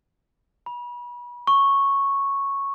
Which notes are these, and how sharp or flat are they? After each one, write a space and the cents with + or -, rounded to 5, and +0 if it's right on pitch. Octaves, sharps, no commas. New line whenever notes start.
B5 -30
C#6 -5